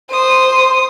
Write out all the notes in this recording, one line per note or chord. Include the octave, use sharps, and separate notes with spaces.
C5 D#6